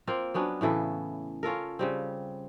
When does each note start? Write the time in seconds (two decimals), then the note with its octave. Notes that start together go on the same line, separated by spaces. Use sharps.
0.07 A#3 C4 F4
0.34 F#3 B3 C#4 D4
0.61 A2 C#3 E3 A4
1.43 C#4 F4 A4 A#4
1.79 C#3 G3 C4